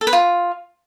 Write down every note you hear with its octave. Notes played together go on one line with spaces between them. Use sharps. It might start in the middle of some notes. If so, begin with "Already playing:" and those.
A4
B4
F4